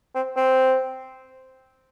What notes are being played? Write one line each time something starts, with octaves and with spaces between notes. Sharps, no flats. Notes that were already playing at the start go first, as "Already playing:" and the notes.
C4
C4